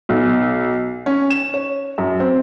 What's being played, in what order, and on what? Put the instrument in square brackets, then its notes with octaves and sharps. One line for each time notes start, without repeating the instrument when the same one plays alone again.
[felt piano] B1
C#4
E7
C#5
F#2
C4